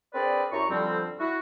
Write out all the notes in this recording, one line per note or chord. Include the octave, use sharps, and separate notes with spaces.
C4 D4 G#4 A#4 B4 D5
F#2 E4 G4 A#5 C#6
F2 D3 F3 G3 C4
E4 F#4